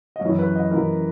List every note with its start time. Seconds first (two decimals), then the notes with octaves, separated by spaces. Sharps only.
0.16 D#5
0.21 F#2 E3 C#5
0.39 B4
0.56 D#5
0.71 F#2 E3 A#4